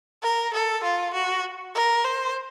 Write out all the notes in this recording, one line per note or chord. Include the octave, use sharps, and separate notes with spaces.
A#4
A4
F4
F#4
A#4
C5